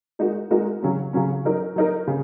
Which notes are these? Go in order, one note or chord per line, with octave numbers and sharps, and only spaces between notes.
G#3 D#4 F#4 A#4
G#3 D#4 F#4 A#4
C#3 F#3 C#4
C#3 F#3 C#4
F#3 D#4 A#4
F#3 D#4 A#4
C#3